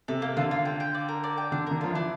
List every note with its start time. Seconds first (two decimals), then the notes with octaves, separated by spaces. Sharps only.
0.08 C3 A4
0.22 A#3
0.37 D3 F4
0.51 F4
0.65 G5
0.80 G5
0.94 D5
1.08 A#4
1.24 D5
1.37 G5
1.52 D3 D4
1.67 D3 A#4
1.81 F3 F4
1.90 E3 D4